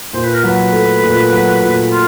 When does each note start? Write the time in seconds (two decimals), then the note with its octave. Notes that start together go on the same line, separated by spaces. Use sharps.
0.13 A#2 C5
0.24 B4
0.34 A#4
0.43 F#3 B4
0.73 A3
1.03 A#2
1.32 F#3
1.62 A#2
1.92 F4